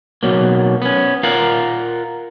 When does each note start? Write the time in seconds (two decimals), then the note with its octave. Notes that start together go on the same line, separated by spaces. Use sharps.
0.23 B2 F#3 A#3
0.82 B3 C#4
1.23 F4 A#4 F5 F#5